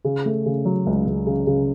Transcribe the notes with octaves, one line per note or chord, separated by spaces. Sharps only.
C#3
A3
C#3
F#3
C#2
C#2
C#3
C#3